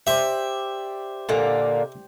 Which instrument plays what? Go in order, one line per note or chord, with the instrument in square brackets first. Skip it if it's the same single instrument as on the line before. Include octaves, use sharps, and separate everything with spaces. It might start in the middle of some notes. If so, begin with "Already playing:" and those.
[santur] G4 C5 D5 [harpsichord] E5
[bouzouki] A#2 D3 A#3